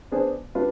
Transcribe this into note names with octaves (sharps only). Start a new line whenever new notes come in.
B3 D4 G#4 C5
G3 D4 F4 B4